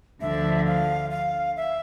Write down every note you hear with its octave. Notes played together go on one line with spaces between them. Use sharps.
D2 D3 F3 E5
F5
F5
E5